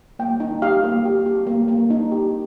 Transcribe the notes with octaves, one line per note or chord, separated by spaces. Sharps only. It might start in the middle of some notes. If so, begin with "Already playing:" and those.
A#3 G5
D#4
G4 F5
A#3
G4
G4
A#3
A#3
D#4
G4